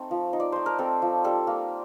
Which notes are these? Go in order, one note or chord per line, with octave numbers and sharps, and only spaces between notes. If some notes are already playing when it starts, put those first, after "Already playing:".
Already playing: A3 C4 D#4 A4
F3
D#4
D5
A3 C5
A#4
C4 A4
F3
G3 A4
A#3